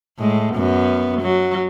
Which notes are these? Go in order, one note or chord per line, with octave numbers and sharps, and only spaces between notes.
A2 G#3
F#2 B3
F#3